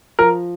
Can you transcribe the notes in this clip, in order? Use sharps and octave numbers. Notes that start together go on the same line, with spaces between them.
F3 A#4